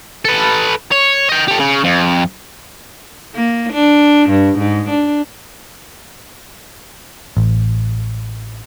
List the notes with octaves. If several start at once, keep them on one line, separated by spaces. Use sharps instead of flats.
A4 B4
C#5
D#5 G5
G4 A4
C#3
F2
A#3
D4
G2
G#2
D4
A1